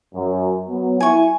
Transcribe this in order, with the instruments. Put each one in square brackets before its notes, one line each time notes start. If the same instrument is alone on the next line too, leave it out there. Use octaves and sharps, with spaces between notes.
[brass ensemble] F#2
F#3 B3
[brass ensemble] E4 [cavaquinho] G#5 C#6